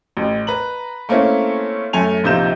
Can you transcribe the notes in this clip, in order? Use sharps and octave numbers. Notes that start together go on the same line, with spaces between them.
A1
B4 A#5 F#7
A3 A#3 C4 C#4 E4
F#2 A3 G#5 F7
A#1 C3 D#4 F4 G6 E7